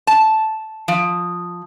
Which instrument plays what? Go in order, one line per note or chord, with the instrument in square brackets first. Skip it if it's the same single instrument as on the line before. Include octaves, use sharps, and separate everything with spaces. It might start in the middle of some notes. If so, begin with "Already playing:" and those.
[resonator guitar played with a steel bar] A5
F3